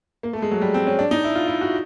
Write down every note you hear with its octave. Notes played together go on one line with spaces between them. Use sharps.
A#3
A3
G#3
F#3
G3
C4
C#4
D4
D#4
E4
F4
E4
F#4